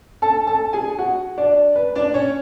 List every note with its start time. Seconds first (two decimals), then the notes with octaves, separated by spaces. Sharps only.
0.22 A4 A5
0.47 A4 A5
0.73 G#4 G#5
0.99 F#4 F#5
1.38 D4 D5
1.76 B4
1.96 D4 D5
2.14 C#4 C#5